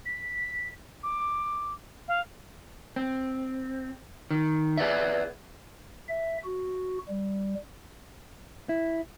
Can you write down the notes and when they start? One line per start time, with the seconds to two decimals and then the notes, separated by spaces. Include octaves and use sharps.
0.05 B6
1.03 D6
2.08 F5
2.96 C4
4.31 D#3
4.77 G#4 B4 D5 E5
6.09 E5
6.44 F#4
7.09 G3
8.69 E4